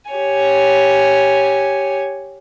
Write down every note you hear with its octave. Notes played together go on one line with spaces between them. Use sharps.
G4 C#5 G#5